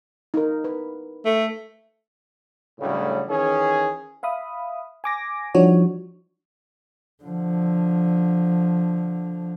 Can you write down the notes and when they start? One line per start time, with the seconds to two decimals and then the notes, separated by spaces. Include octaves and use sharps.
0.34 D#4 A#4
0.64 B4
1.25 A3
2.79 D2 A2 C#3 F#3 G3
3.28 D#3 E3 C#4 G#4
4.23 E5 F5 B5 D#6
5.04 G#5 D6 A#6
5.54 F3 G3 D4 D#4 F#4 C#5
7.23 D3 F3